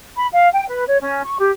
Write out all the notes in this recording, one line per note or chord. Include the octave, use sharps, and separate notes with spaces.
B5
F5
G5
B4
C#5
C#4
C#6
G4